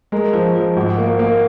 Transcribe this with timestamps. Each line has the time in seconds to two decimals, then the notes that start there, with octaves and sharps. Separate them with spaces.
0.12 G#3 A#4
0.33 F3
0.55 F3
0.77 G#1
0.98 A#3
1.19 A#3